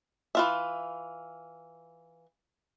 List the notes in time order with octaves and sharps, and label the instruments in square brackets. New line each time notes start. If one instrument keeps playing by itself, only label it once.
[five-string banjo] E3 F4 E5